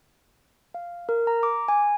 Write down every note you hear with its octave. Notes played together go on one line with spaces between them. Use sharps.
F5
A#4
A#5
D6
G#5